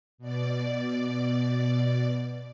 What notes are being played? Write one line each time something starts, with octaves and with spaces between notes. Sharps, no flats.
B2 D5